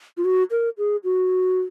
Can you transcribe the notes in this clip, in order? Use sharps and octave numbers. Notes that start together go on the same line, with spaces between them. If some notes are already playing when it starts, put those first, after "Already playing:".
F4
F#4
A#4
G#4
F#4